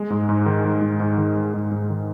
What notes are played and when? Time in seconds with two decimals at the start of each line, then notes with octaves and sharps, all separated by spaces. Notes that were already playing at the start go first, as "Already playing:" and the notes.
Already playing: G#3
0.10 G#2
0.29 G#2
0.46 D#3
0.65 G#3
0.82 G#2
1.00 G#2
1.17 D#3
1.36 G#3
1.54 G#2
1.71 G#2
1.90 D#3